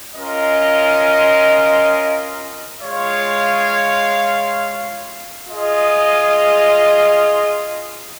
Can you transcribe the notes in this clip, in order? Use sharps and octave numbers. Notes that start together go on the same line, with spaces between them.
C#4 F4 A#4 D#5
G#3 F4 C#5 F5
F4 G#4 D#5